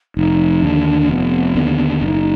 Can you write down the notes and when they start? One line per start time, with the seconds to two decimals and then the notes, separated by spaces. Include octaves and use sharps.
0.16 F1 D#4
0.62 D#2 D3 D4
1.09 F1 B3
1.55 D#2 D3
2.02 F#1 D#4